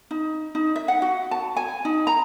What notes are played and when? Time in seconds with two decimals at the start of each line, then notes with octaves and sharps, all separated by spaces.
0.11 D#4
0.55 D#4
0.76 E5
0.88 F#5
1.02 F#4
1.31 A5
1.56 G#5
1.85 D#4
2.07 A#5